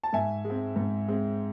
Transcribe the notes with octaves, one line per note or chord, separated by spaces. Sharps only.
A5
G#2 E5 G#5
G#3
C4
G#2
G#3 C4